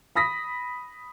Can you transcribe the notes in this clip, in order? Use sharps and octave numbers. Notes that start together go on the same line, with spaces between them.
B5 D#6 A#6 B6